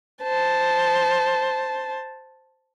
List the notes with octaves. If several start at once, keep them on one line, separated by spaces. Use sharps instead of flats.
C5 A5